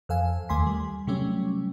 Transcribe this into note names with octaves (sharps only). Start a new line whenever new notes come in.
F2 A4 F5 G#5
D#2 A3 G#5 C6 B6
G3
C3 F#3 G3 A3 C#4